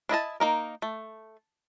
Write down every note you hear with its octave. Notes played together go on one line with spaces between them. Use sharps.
D4 E4 D#5 A5
A#3 D#4 A#4
A3